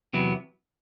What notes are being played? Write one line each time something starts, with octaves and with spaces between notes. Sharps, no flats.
E2 C3 F#3 B3 E4